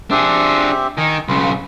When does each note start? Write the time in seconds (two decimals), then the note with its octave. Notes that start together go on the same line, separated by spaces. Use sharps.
0.11 C4 D4 G4 G#4 E5
0.98 D#3 D#5 G#5
1.28 B1 C#3 F4 B5